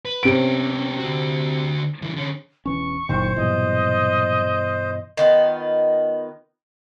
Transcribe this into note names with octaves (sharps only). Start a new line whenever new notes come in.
B4
C3 B3 C#4 D7
D3 F#4
C#3 E3
D3 C#4
E1 E3 C#4 C#6
F#1 A#2 D#3 F#3 C5
G2 B2 E3 D#5
D#3 B3 F4